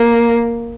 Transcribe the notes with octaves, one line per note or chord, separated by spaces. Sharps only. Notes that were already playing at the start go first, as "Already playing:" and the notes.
Already playing: A#3